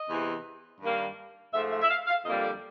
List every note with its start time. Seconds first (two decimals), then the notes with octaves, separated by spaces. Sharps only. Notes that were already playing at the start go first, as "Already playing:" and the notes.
Already playing: D#5
0.09 E2 C3 E3
0.81 G2 D#3 G3 A#3
1.53 G#2 F3 A3 E5
1.71 E5
1.82 E5
1.90 F5
2.07 F5
2.25 F2 D3 G3 A#3 D#5
2.43 D5